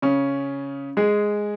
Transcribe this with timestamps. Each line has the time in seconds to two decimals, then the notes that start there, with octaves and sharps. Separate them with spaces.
0.02 C#3 C#4
0.97 G#3 G#4